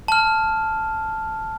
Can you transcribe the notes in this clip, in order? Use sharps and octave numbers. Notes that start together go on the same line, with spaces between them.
A5 F6